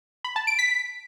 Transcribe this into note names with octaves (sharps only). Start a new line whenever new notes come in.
B5
A5
D7
B6